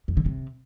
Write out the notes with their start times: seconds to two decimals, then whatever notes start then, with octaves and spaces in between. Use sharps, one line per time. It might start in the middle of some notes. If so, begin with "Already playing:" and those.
0.08 F2
0.17 D3
0.26 C3